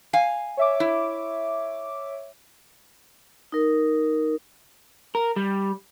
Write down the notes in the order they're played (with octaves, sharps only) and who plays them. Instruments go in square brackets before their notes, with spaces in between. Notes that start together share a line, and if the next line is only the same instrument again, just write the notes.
[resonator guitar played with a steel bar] F5 G#5
[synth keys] C#5 E5 D6
[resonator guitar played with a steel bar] E4
[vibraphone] D#4 A#4
[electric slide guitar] A#4
G3